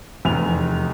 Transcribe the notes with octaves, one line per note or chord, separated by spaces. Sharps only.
F1 E2 G#5 F7